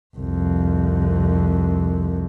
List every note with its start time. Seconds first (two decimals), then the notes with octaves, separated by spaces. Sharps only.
0.16 C2 F2